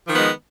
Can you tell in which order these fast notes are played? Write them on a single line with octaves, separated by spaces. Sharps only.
F3 D#3 B3 G#3